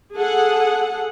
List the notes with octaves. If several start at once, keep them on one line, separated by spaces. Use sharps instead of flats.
G#4 A4 F#5